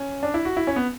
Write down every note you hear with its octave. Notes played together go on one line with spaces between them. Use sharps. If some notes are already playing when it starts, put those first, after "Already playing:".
Already playing: C#4
D4
E4
F#4
E4
C#4
B3